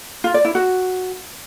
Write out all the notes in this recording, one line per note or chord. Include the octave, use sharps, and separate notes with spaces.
F4
D5
E4
F#4